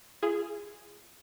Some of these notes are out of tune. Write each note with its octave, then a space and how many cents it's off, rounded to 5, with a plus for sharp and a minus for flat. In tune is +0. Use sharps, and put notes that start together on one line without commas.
F4 -45 G#4 +0